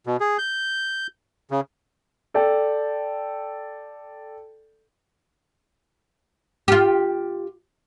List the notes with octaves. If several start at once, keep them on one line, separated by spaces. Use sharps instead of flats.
B2
G#4
G6
C#3
A4 D5 G5
F4 G4